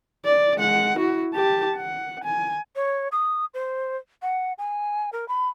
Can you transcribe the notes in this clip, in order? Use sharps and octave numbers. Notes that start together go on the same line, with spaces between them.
D5
G#3 F#5
E4 F#4
G4 A5
F#5
G#5
C#5
D#6
C5
F#5
G#5
A#4
B5